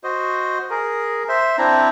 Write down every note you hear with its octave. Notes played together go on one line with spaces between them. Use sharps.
F#4 C5 D#5
G#4 A#4
C5 E5
C4 D4 E4 A#5